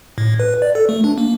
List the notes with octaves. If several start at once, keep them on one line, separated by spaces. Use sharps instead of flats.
A2
B4
D5
A4
A3
D4
A#3